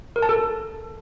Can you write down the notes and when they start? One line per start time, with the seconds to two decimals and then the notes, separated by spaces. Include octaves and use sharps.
0.16 A#4
0.22 A5
0.29 A4